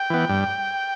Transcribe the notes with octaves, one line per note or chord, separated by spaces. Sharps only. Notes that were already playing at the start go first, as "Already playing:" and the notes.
Already playing: G5
E3 B3
G2